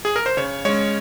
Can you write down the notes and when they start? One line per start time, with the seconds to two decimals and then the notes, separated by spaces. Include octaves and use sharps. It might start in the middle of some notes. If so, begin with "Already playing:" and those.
0.05 G#4
0.16 A#4
0.26 C5
0.37 C#3 C#5
0.65 G#3 C#4 C#5